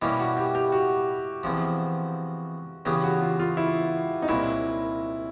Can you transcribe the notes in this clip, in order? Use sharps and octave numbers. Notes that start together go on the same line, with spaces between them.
B2 G3 A#3 C#4 E4
F#4
G4
G4
F#4
E2 C3 F3
E2 C#3 F#3 B3 G4
F#4
F4
F4
E4
D#4
C2 A#2 F#3 E4